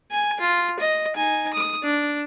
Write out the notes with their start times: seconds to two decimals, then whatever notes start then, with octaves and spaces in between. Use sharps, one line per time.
0.11 G#5
0.40 F4
0.79 D#5
1.16 D#4 G#5
1.53 D#6
1.83 D4